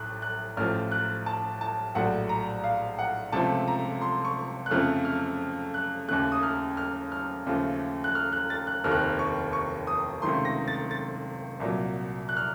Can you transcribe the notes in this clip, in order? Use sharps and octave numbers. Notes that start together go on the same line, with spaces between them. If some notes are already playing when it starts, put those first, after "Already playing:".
Already playing: A1 A2 A3 F#6
F#6
A1 A2 F3 F6
F#6
A5
A5
A#1 A2 F#3 F#5
A#5
F5
F#5
C#2 C3 F3 A3 A5
A#5
C6
C#6
F#6
F2 C#3 F3 A3 F6
F6
F#6
D#2 C#3 A3 F#6
D#6
F6
F6
F6
D#2 C#3 F3 A3
F#6
F6
F#6
A6
F#6
F1 D#2 D#3 F6
F#6
F6
C#6
C#6
D#6
C#2 C3 D#3 A3 C6
A#6
A6
A6
C2 A#2 F#3
F#6
F6